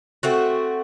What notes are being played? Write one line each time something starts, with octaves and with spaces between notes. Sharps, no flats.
A3 C4 F#4